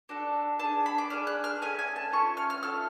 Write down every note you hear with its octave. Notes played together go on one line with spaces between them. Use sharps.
D4 F#4 A4
D4 G#4 A5
B5
D6
D4 G#4 F6
F#6
F6
A3 C#4 G#4 G#5
G#5
A5
A3 C#4 F4 C#6
F6
F6
A3 F4 A4 F6